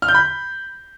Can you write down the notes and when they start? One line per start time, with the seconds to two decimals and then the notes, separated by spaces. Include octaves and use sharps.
0.02 F6
0.08 G6
0.14 B5